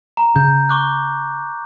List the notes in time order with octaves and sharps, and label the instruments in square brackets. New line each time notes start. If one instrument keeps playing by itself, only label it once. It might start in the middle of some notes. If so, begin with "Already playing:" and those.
[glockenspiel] A#5
[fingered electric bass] C#3 [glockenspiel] G6
[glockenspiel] C#6 D6 F#6